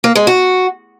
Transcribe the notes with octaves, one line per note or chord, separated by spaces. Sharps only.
A#3
G#3
F#4